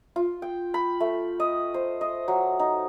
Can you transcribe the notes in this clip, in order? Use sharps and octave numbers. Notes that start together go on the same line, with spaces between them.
F4
G5
B5
A3
D#5
C5
D#5
F#3
D#4